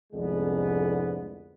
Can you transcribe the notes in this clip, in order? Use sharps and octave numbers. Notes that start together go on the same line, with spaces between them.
C2 F2 G#2 D3 G#3 B3